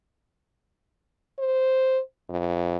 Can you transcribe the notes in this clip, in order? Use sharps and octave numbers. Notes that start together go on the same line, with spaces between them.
C5
F2